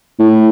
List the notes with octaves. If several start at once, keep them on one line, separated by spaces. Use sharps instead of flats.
A2